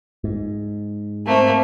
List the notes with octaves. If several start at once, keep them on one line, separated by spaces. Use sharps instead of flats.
G#2
A3 A#3 C4